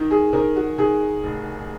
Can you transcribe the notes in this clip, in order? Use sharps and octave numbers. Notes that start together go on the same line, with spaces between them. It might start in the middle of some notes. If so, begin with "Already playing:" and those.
Already playing: D#3
G#4
D#3 A#4
F#4
D#3 G#4
F1